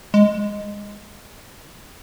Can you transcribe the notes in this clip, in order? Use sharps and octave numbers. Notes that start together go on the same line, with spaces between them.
G#3